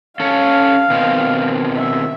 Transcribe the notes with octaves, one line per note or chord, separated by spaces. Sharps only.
C#4 A4 F5
B2 D#3 C4
E5